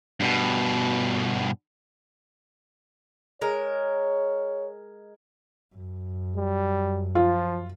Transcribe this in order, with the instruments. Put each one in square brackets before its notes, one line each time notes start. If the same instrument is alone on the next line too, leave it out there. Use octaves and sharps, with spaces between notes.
[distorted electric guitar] G2 B2
[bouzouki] G#3 A#4 [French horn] C#5
[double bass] F#2
[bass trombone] G3
[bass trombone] F3 [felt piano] F4